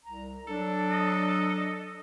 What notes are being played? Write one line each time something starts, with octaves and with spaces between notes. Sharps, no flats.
C2 A#5
F#3 D4 A4
D#5